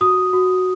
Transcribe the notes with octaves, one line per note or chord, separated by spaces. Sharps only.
F#4 D#6
F#4